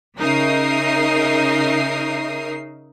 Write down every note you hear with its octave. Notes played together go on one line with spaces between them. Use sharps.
C#3 D#4 A#4 E5 D#6 C7